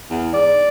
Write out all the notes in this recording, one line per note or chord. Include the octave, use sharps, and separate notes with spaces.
E2
G#2 D5